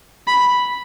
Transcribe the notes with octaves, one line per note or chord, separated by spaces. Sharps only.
B5